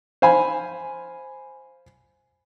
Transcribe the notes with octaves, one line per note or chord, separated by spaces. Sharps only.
C5 F5 G#5 B5